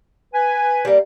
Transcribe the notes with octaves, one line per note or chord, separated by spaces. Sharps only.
B4 G#5
G3 A#3